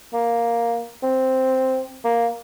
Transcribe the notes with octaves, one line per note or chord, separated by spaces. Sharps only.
A#3
C4
A#3